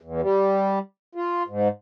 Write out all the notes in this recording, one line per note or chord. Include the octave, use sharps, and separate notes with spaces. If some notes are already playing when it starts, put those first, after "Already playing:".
E2
G3
F4
G#2